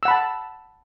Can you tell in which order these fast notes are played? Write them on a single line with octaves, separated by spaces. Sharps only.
E6 F#5 B5 A5